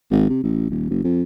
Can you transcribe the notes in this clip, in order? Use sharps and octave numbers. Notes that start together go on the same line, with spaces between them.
G#1
C3
A1
D#1
F#1
F2